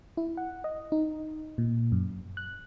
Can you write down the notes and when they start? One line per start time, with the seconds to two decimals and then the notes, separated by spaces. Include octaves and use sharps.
0.17 E4
0.37 F#5
0.64 D#5
0.92 D#4
1.58 A#2
1.92 F#2
2.37 F#6